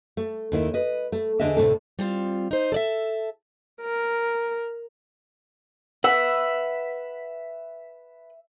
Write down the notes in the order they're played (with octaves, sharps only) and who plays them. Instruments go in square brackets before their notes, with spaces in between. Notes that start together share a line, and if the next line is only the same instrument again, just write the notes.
[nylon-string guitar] A3
D#2 D#3 E4
B4 D#5
A3
E2 D3 D4 G#4 D#5 E5
D2 A2 C3 A3 A4
[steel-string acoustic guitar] G3 C4 F4
D#4 C5
A4 D5 E5
[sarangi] A#4
[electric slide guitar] B4 F#5 [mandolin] E5